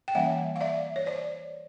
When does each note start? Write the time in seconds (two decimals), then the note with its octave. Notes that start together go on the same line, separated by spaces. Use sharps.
0.08 G5
0.15 E3 G3 A#3 C#4 E5 F#5
0.56 F5
0.61 D5 E5
0.96 C#5
1.06 C5 D5